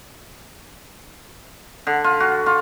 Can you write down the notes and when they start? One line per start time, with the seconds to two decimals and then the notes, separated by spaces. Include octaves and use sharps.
1.87 D3
2.04 F4
2.20 F#4
2.46 F4